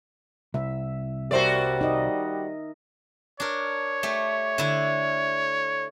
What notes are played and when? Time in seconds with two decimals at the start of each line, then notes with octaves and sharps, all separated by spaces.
0.54 C2 E5
1.31 G3 F#4 A#4 C5 D5 E5
1.81 D#4 D#5
3.40 D4 A#4 C#5
4.03 A3 G4
4.58 D3 E4